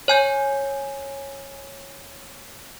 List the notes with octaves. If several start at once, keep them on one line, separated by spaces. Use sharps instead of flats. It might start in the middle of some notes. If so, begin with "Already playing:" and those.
C#5 G#5 G6